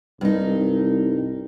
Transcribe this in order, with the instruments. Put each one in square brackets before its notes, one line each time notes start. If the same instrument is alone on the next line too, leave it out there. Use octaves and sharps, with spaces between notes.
[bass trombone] C2 [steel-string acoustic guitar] G2 D#4